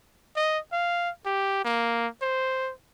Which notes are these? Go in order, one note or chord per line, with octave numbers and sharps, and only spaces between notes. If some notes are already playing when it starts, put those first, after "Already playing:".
D#5
F5
G4
A#3
C5